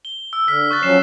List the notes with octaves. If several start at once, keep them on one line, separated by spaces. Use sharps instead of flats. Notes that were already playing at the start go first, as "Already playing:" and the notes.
G7
E6
D3 E6 F6 B6
C#6 F#6 A6
F3 F#3 C#4 C7 E7